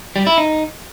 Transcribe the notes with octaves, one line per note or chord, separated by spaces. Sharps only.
G3
E4
D#4